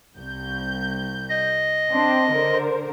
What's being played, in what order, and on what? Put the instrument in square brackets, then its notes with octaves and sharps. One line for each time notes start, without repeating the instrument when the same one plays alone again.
[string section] C2 G6
[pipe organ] D#5
[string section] C4 D4 C6
D3 A#4 C5